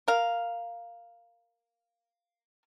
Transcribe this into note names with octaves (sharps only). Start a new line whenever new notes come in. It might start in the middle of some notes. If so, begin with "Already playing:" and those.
A#4 F5